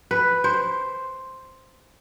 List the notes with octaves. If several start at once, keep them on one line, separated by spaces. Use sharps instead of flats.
B4
C5